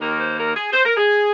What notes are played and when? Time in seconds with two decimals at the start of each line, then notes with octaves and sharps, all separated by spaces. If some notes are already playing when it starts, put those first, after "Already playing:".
0.01 D#2 D#3 A#3 A#4
0.19 C5
0.38 A#4
0.55 G#4
0.73 C5
0.84 A#4
0.97 G#4